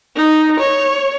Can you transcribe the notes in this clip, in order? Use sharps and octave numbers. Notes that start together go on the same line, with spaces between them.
D#4
C#5